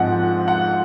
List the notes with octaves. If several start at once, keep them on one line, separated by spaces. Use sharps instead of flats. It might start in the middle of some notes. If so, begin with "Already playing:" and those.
Already playing: G#2 F3 G#3 C4 F#5
F#5